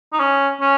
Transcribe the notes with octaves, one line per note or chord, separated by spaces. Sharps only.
D#4
C#4
C#4